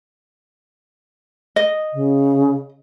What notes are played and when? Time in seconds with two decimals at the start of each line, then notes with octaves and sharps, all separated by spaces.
1.56 D#5
1.93 C#3